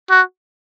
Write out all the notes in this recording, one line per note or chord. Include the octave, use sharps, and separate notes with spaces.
F#4